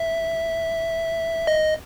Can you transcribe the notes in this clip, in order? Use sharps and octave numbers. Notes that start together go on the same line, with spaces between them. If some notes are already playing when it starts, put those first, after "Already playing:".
Already playing: E5
D#5